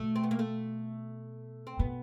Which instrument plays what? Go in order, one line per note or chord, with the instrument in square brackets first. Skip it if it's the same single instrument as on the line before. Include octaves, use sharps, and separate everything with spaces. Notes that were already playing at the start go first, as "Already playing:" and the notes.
Already playing: [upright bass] B2 [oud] A3
[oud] C4
B3
A#3
A3
C4
[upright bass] B2 [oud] B3